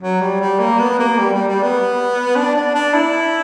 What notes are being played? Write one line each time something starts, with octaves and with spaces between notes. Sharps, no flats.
F#3
G3
G3
A#3
B3
A#3
G3
G3
G3
B3
D4
D4
D4
E4